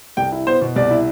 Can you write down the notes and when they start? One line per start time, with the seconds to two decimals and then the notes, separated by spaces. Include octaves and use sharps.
0.17 C2 G5
0.32 E4
0.47 B3 C5
0.61 B2
0.76 C2 D5
0.91 E4